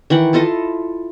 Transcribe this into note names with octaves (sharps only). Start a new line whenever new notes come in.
D#3 E3 F#5
E4 F4 A4 D#5